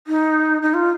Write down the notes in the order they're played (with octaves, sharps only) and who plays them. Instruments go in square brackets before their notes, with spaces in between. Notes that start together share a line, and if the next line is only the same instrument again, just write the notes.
[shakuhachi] D#4
D#4
F4